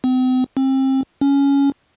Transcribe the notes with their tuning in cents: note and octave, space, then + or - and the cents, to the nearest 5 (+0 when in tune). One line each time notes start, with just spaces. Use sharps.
C4 -40
C4 +30
C#4 +10